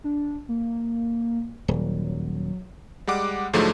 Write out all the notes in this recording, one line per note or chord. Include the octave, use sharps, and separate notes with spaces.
D4
A#3
D#1 F#3
G3 G#3 F#5 D6
G#2 D3 F3 F#3 G#3 A3